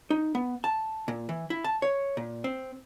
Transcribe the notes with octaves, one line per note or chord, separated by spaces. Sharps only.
D#4
B3
A5
A#2
E3
E4
A5
C#5
A#2
C4